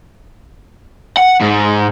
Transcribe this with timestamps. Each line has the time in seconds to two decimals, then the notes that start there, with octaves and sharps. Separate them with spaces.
1.17 F#5
1.41 G#2